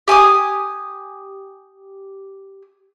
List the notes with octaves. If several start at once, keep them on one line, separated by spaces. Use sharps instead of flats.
G4 G#5 D6 D#6